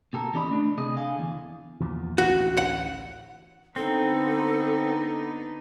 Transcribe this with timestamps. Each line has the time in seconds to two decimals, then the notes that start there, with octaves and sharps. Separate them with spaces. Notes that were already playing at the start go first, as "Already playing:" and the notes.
0.13 B2 G4 A4 A#4
0.34 E2 C#4 G4 D5 D#5 B5
0.50 A3 D4
0.78 C3 G#4 D#5
0.97 D3 F5 G#5
1.19 E2
1.80 E2 A#2 F3
2.18 A1 D2 F#4
2.57 F#5
3.76 D3 B3 C4 D#4 A4